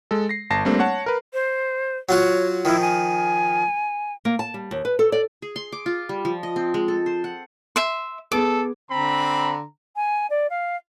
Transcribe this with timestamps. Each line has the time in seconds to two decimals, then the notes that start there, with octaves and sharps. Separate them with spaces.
0.11 G#3 A4
0.29 A#6 C7
0.50 G1 A5 A#6 C7
0.65 G3 A3 A#3 C4 D4
0.79 C#5 F#5 A5
1.06 A#4 B4
1.33 C5
2.09 F#3 F4 F#4 C#5
2.65 D#3 F3 E4
2.81 G#5
4.25 A#3
4.39 A5
4.54 G3
4.71 D#2
4.85 B4
4.99 A4
5.12 D5
5.42 G#4
5.56 C6
5.72 D6
5.86 F4
6.09 G3
6.25 F3
6.43 D#5
6.56 C4
6.74 G#3
6.88 A4
7.06 C5
7.24 F#5
7.76 E5 C6
8.32 B3 G#4 A4 D6
8.91 D3 C4 A#5 B5
9.96 G#5
10.30 D5
10.49 F5